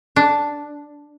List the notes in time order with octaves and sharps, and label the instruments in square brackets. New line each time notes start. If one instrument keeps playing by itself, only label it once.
[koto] D4